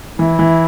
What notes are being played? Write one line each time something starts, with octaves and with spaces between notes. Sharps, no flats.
E3 E4
E3